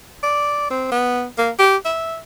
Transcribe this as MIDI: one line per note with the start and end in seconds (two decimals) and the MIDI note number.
0.23 0.70 74
0.70 0.90 60
0.91 1.25 59
1.38 1.50 58
1.59 1.76 67
1.85 2.18 76